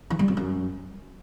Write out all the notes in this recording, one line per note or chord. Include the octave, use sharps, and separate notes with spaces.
E3
G3
F2
F#2